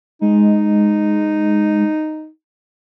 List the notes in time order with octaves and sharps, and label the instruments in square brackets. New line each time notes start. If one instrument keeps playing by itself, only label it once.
[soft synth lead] G#3 [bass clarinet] D#4